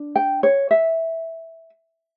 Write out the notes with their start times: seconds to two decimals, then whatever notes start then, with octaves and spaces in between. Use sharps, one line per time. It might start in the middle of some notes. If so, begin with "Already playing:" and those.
Already playing: D4
0.16 G5
0.43 C#5
0.71 E5